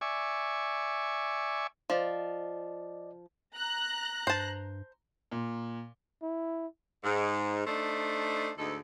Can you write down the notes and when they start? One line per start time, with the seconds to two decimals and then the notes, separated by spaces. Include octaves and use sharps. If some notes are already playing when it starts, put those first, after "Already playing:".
0.01 D5 E5 G#5 C#6
1.90 F3 D5 D#5
3.55 A#5 F#6
4.27 G2 C5 A5
5.32 A#2
6.22 E4
7.04 G#2
7.66 A3 D4 D#4 C5 E5
8.57 D2 G#2 D#4 A4